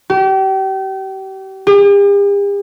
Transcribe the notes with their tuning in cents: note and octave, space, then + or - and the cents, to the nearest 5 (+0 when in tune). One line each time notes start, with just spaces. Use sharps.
G4 -35
G4 +45